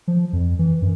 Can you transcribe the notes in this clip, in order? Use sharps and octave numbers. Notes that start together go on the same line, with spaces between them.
F3
F2
E3
F#2